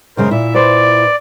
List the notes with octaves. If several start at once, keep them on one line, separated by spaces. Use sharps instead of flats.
F#2 C#3 G#3 A#4 C5
A#2 E4 E5
B4 C5 D5